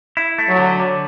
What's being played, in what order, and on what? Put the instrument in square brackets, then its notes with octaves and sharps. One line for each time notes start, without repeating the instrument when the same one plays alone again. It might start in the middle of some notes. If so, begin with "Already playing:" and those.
[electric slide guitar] E4
A3
[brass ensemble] F#3
[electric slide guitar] D3
D3